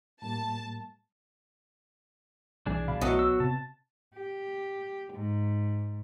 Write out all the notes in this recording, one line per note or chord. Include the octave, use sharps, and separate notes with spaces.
A2 G3 A#3 A5
B1 E3 G3 D4 G#4
B2 F5 B5
B1 E3 F#3 A3 B3 D#5
E6
C3 A5
G4
G#2